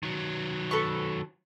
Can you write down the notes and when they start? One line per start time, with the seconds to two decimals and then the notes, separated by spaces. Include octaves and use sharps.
0.03 D#3 F#3
0.71 A4 B4 C#6